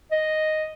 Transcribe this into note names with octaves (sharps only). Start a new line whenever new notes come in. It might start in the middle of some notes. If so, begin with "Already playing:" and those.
D#5